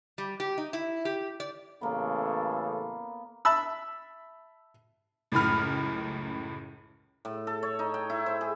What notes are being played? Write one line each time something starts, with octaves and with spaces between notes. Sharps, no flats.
G3
G4
D#4
E4
G4
D5
A1 C#3 A#3 B3 A4
E5 A5 B5 E6
C#2 F#2 A2 B5 F6
A2
A4
C#5
D#4
G5
E4
C5
G#4